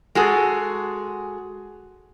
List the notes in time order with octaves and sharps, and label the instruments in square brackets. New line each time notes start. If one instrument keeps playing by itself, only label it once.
[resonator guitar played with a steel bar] G#3 F#4 G#4 A4